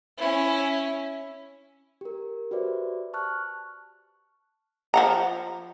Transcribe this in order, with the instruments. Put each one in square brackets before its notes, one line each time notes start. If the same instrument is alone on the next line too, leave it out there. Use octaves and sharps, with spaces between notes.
[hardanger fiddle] C#4 E4
[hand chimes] G4 A#4
F#4 G4 B4 C5 D5 E5
A5 C#6 F6 F#6
[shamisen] F3 F#5 A#5